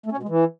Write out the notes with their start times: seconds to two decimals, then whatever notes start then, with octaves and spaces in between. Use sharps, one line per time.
0.06 A3
0.12 C#4
0.17 B2
0.23 G#3
0.29 E3